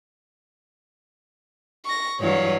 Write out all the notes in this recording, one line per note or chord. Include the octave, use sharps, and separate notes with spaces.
C#6 A#6
G2 E3 F#3 C#5 F5